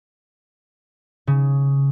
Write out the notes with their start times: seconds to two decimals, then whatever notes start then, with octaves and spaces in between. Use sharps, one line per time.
1.27 C#3